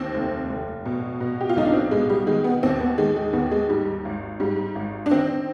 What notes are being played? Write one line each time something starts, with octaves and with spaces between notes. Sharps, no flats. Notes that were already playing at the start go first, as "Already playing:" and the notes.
Already playing: D#2 D#3 C4
F1
F1
B2
B2
G4
F4
B1 D#4
D4
C4
B2 G#3
G3
D#3 G#3
B3
D#2 C4
B3
D#3 G#3
G#3
D#2 B3
G#3
G#2 G3
G#1
G#2 G3
G#1
D4
D#3 C4